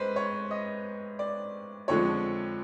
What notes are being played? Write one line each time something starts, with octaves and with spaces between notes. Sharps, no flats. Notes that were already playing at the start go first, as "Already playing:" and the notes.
Already playing: G#2 G#3 B4 C5
C#5
D#5
D5
F2 D3 F3 G#3 C#5